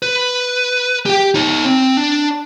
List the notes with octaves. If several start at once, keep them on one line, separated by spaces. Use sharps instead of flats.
B4
G4 G5
D#4 C#5
C4
D4